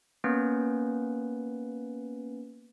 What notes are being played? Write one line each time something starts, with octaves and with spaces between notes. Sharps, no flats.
A#3 B3 C#4 B4